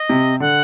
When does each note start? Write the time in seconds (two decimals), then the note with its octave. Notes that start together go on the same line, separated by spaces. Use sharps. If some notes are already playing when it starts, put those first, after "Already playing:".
Already playing: D#5
0.10 C3
0.40 D3 F#5